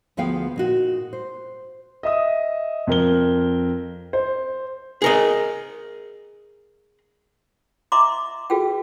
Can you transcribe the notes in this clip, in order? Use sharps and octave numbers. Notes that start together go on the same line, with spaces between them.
D2 F3 B3 G#4 F5 G5
A#2 D#4 F#4
C5
D#5 E5 D#6
F2 A#4 G7
C5
G#4 A#4 D#5
D#5 E5 A#5 C6 D6
F#4 G#4 A4 B4 G5